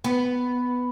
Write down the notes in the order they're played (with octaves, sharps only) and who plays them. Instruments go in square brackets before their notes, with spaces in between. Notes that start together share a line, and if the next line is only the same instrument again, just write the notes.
[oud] B3